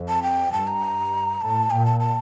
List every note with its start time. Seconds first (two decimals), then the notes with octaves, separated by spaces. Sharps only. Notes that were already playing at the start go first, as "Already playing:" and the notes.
Already playing: F2
0.09 A5
0.23 G5
0.52 G2 A5
0.67 A#5
1.41 A2 A5
1.70 A#2 G5
1.86 A5
2.00 A5